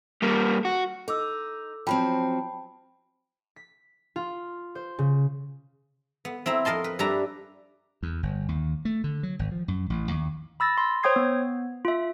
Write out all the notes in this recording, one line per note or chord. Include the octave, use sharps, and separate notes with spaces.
G3 A#3
F#4
D#4 A4 D6 E6
F3 F#3 C4 G5 A5 B5
B6
F4
C5
C#3
B3
C4 E4 E5 A#5
F2 A#4 D#5 A5 C6
B4
G2 G3 D4 B4 E5 A#5
E2
G1
D#2
A3
D3
F#3
G#1
F3
F#2
A1
D#2
B5 E6 A6 A#6
C6
C5 C#5 G5 D#6 G#6 C7
B3
F4 E5